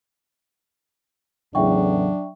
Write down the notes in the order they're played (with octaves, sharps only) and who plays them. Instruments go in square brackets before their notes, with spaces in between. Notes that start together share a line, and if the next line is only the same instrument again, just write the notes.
[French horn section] E2 A2 C#3 [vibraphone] F#3 [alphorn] D4 [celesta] E5 G5 C#6